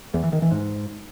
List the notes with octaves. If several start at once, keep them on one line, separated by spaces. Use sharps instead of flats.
E2
E3
D#3
E3
G#2